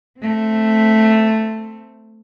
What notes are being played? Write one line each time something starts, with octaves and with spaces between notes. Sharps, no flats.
A3 C4